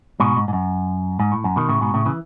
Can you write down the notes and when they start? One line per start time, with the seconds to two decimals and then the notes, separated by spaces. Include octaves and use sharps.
0.20 G#2 B2
0.36 G#2
0.48 G#2
0.53 F#2
1.20 G#2
1.32 A2
1.44 F#2
1.56 B2 D#3
1.69 A2 C#3
1.81 G#2 B2
1.94 A2 C#3
2.06 C#3 E3